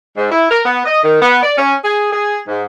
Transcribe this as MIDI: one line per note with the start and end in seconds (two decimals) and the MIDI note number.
0.17 0.29 44
0.32 0.48 64
0.50 0.62 70
0.66 0.80 59
0.86 0.99 75
1.03 1.20 51
1.22 1.39 59
1.43 1.53 74
1.58 1.74 61
1.84 2.10 68
2.13 2.39 68
2.48 2.65 44